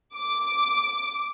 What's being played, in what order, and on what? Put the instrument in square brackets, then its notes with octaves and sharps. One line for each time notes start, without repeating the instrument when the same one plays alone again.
[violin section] D6